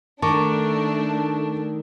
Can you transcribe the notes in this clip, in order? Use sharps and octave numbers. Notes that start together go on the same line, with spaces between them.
D#3 A3 D4 A5 C#6 D6